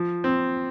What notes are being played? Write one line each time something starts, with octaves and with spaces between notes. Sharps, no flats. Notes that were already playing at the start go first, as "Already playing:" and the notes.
Already playing: F3
C4